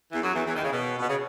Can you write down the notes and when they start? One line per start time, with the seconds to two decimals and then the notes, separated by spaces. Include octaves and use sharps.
0.11 E2 E3
0.22 F#2 F#3
0.34 E2 E3
0.46 E2 E3
0.55 D#2 D#3
0.63 C#3
0.72 B2
0.99 B2
1.07 C#3